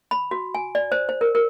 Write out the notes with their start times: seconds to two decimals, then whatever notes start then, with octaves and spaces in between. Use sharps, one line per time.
0.11 B5
0.31 F#4
0.55 G#5
0.75 D5
0.92 C5
1.09 C5
1.21 A#4
1.35 A#4